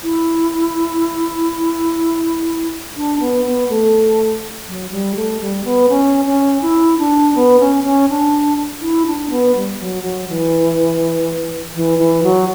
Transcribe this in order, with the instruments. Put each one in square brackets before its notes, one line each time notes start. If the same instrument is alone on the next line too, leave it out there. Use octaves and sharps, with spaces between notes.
[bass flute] E4
D4
B3
B3
A3
F#3
G3
A3
G3
B3
C#4
C#4
E4
D4
B3
C#4
C#4
D4
E4
D4
B3
G3
F#3
F#3
E3
E3
E3
F#3